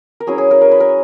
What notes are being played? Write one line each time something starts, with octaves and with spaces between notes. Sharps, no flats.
A#4
F#3 C#4 E4 G#4
G#4
A#4
A#4
B4
A#4